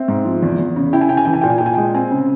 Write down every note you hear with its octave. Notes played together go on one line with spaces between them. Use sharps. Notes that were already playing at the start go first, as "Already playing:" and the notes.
Already playing: C4 E5
G#2
F3
E2
E2
C#3
E4 G5
G#5
C#3 G5
G#5
E3 G5
G#5
A#2 G5
G#5
A#2 G5
G#5
G#3 G5
C4 G#5
C#3